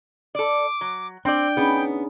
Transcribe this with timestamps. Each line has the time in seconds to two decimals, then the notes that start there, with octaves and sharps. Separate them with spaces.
0.35 A4 D5 D6
0.81 F#3
1.25 C4 D4 D5 G5
1.57 B3 C#4 D#4 G#4